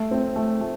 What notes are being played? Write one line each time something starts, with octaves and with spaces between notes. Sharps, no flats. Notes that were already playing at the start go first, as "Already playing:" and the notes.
Already playing: A3
C4
A3
A3